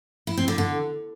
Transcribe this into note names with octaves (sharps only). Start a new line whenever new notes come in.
E4
C4
D3
D3